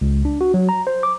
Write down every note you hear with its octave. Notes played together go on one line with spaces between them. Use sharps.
C#2
D4
F#4
F#3
A#5
C5
D6